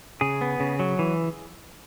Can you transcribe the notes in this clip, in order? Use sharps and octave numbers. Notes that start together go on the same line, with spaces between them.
C#3 G#4
B3
C#3
F#3
E3